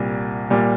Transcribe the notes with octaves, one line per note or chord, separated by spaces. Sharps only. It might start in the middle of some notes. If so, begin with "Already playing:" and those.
Already playing: C2 A#2 G3
A#2 G3